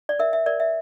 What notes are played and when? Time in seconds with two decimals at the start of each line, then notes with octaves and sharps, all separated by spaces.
0.09 D5
0.19 A#4 E5
0.33 E5
0.46 A#4 D5
0.60 E5